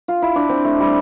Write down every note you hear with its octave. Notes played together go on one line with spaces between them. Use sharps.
F4
E4
D4
C4
A3
G3